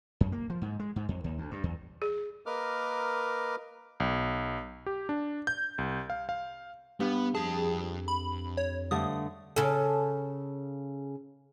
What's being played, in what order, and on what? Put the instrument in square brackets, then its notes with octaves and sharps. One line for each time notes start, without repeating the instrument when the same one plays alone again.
[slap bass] F#2
A#3
F3
G#2
G#3
G#2
F2
D#2
D2
G2
E2
[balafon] G#4
[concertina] A#3 A#4 B4 D#5 D6 F6
[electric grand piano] B1
G4
D4
G6
C2
F5
F5
[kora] G2 [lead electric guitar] B3
[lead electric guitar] F2 A5 [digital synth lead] G#4
[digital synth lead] B5
C#5
[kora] G2 D3 A3 [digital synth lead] D#6
[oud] C#3 A4